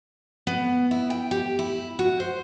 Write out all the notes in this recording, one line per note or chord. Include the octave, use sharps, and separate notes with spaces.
B3
E4
G5
G4
E4
F#4
C5